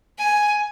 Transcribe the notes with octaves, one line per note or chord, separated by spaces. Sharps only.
G#5